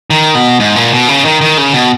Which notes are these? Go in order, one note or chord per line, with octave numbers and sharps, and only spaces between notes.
D#3
B2
G#2
A#2
B2
C#3
D#3
D#3
C#3
B2